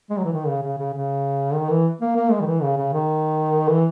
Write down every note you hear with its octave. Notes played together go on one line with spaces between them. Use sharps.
G#3
F#3
E3
D#3
C#3
C#3
C#3
C#3
D#3
E3
A#3
A#3
G#3
D#3
E3
C#3
C#3
D#3
E3